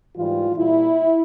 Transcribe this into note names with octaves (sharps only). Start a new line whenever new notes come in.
G#2 E3 G3 F4
A#2 G3 E4